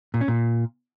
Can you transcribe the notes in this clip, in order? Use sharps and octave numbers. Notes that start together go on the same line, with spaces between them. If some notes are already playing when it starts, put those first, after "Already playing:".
A#2
C#4
A#2